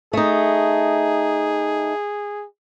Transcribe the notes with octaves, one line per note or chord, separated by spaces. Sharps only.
A3 D#4 G#4